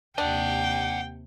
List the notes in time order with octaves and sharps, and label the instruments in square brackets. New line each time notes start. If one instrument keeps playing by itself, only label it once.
[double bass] D#2 C3 [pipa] D4 [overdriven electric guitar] D#5 F#5 [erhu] G5